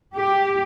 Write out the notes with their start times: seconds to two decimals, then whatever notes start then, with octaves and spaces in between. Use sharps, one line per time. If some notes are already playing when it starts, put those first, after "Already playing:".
0.15 G4